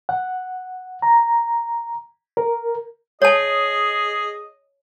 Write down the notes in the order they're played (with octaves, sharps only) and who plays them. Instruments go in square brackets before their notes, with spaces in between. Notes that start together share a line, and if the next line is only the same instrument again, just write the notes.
[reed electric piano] F#5
A#5
A#4
[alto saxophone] G#4 [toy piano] C#5 A5 [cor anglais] D#5